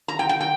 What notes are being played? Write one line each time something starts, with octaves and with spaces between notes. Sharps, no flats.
A#5
G5
G5
G5